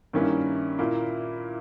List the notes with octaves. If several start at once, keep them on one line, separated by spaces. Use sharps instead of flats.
G2 D#3 A#3 C#4 E4
A#2 A#3 E4